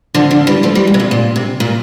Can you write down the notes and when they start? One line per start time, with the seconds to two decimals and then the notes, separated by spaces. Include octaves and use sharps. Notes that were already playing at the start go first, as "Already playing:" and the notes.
0.14 D3 F3
0.31 D3 F3
0.47 E3 G3
0.63 F3 A3
0.75 E3 G3
0.87 A#2
0.94 C3
1.00 A#2
1.11 A#2
1.36 C3
1.60 A#2